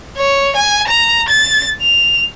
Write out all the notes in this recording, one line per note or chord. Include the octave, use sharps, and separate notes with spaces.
C#5
G#5
A#5
A6
F7